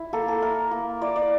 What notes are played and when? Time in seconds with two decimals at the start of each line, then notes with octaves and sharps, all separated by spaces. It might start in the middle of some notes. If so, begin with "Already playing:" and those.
Already playing: E4
0.13 A#3 A4
0.28 A4
0.42 E4 A#4
0.71 A#3
1.02 E4 D5
1.16 D5